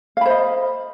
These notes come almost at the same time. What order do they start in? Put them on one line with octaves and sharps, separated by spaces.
F5 B5 C5 D#5